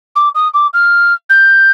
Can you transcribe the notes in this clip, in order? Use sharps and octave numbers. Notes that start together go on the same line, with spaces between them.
D6
D#6
D6
F6
G6